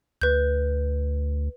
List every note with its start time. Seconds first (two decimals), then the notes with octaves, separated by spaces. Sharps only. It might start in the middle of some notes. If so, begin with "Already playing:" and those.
0.21 D2 B4 G6